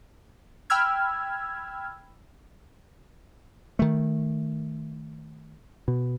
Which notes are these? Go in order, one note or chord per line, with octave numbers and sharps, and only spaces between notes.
G5 B5 E6 F6 G#6
D#3 A3
B2